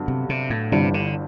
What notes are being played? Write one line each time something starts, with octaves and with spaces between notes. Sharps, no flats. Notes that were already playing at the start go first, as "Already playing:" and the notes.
Already playing: G2 D3 F#3 B3
C3
C3
A2
G1 G2 C3 E3 G3
D3